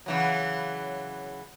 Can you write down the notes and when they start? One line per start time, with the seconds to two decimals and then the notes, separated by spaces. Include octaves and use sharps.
0.06 C#3 E3 F#3